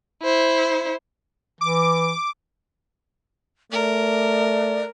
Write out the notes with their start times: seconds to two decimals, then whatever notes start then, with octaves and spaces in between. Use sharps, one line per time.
0.22 E4 C5
1.61 E3 D6
3.72 A3 A#4 D5